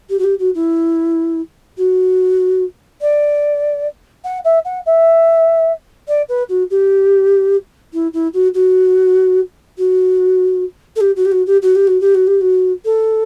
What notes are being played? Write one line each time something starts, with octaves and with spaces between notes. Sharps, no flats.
G4
F#4
G4
F#4
E4
F#4
D5
F#5
E5
F#5
E5
D5
B4
F#4
G4
E4
E4
F#4
F#4
F#4
A4
G4
F#4
G4
F#4
G4
F#4
G4
F#4
G4
F#4
G4
F#4
A4